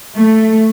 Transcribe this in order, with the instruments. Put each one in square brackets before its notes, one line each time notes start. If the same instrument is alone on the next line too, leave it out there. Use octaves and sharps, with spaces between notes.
[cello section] A3